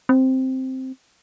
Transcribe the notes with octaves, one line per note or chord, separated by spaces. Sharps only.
C4